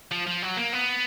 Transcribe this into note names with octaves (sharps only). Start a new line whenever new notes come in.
F3
F3
F#3
A#3
B3